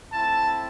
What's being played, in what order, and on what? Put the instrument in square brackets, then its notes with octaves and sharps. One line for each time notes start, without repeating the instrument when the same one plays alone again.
[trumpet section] A3 C4 E4 A5